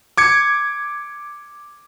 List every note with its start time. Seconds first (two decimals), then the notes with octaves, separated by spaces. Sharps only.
0.18 D6 G#6 C#7